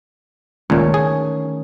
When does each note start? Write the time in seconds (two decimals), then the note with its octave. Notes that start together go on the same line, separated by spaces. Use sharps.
0.70 C#2 A#2 D#3 A3 C#4
0.94 G#4